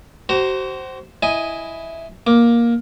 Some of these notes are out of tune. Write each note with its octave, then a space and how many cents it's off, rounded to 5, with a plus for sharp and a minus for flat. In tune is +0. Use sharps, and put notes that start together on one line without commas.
F#4 +40 C5 +0 A#5 -5
E4 +0 D#5 +10 G#5 +0
A#3 +10 D6 +0